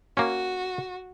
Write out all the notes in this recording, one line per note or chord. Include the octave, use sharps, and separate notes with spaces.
A#3 C#4 F#4